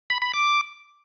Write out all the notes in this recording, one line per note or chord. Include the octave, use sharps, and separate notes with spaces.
B5
B5
D6